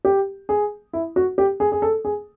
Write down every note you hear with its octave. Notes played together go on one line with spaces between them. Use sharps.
G4
G#4
E4
F#4
G4
G#4
G#4
A4
G#4